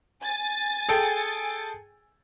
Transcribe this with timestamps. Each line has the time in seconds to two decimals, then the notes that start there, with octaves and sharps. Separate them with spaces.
0.23 G#5 A6
0.89 G#4 A4 G5